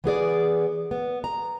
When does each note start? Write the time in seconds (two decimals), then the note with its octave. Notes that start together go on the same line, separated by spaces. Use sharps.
0.04 E3 B3 G#4 D5
0.91 B3
1.24 A#5